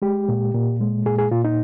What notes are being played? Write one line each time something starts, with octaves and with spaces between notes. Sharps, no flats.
G#3 G4
A#2
A#2
G#3
A#2 G#4
G#4
A#2 F4
D#4